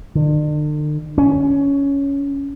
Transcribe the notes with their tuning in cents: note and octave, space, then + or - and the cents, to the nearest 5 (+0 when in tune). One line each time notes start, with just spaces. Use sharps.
D3 +45
C#4 +10